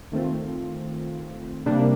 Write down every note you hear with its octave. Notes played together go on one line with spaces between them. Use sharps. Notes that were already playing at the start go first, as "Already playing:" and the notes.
D#3 A3 C4 F4
C3 G3 A#3 D4